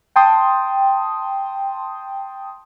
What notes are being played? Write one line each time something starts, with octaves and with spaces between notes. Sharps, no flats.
G5 A5 C6 D#6